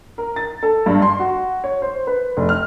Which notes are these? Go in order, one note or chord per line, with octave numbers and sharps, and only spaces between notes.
A#4
A6
A4
G2
C6
F#4
C#5
C5
B4
F1
F6